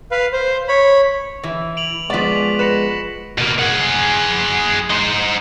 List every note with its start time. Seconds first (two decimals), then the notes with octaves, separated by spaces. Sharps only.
0.11 B4 F5
0.33 C5
0.68 C#5 B5
1.44 E3 E4
1.77 D7 F7 F#7
2.10 F3 G#3 B3 D5 C#6 B6
2.59 B4 A#6 C#7 E7
3.38 B2 A#3
3.59 G#4 F#5
4.90 D#4 C5